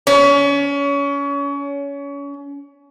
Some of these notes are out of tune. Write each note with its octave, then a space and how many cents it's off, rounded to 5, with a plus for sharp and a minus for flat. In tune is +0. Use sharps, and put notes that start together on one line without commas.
C#4 +30